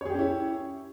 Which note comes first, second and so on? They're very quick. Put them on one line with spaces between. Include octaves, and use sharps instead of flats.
C#5 G#4 G4 C#4 E4